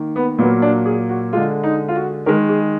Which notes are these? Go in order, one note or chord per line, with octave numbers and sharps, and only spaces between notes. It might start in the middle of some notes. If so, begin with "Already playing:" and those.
Already playing: D#3 A#3
B3
A#2 F#3 A#3 B3
D4
G#4
F#4
D3 G#3 F4
D#4
F4
F#4
D#3 G#3 A#4
G#4